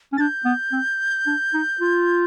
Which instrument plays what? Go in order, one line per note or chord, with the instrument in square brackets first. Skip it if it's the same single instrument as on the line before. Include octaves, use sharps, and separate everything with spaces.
[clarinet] C#4
[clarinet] D4 [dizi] G6 A6
[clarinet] B3
C4
D4
D#4
F4